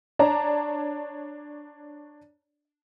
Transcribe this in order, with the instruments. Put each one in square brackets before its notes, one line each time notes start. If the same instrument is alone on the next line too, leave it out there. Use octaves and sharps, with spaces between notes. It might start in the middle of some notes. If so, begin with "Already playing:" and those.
[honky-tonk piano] D4 C#5 D5 A5 A#5